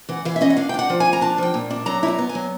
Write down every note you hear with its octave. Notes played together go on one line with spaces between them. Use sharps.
E3 F#5
E3 F5
E5
C#4 D#5
F#5
D4 F5
G5
D4 F#5
F3
G#5
F3
A#5
D4 A5
F3 G5
A#2
D4
F#3 A#5
E4
A#5
B3
G#5
F#3